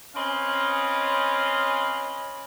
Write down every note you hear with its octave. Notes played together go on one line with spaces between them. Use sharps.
C4 C#4 B4 D#5 F5